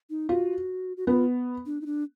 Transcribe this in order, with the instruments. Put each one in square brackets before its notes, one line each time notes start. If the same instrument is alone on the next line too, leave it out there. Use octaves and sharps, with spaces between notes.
[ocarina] D#4
[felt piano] F4 [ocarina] F#4
[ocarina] F#4
[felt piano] B3 [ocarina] F4
[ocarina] D4
D#4
D4